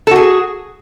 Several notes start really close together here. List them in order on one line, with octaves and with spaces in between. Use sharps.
A4 F#4 G#4